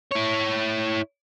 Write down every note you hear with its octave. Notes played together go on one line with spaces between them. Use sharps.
E4 C#5